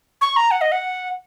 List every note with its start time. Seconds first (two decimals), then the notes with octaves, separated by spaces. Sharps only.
0.21 C#6
0.36 A#5
0.51 F#5
0.61 D#5
0.72 F#5